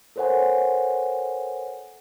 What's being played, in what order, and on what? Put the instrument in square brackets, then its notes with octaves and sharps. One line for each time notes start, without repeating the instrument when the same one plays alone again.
[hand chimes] A4 A#4 C5 C#5 F#5 G#5